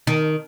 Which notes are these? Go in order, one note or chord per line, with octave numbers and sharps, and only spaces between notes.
D#3